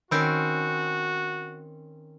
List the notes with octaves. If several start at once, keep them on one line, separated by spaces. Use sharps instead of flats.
D#3 C4 C#4 F#4 B5 E6 G6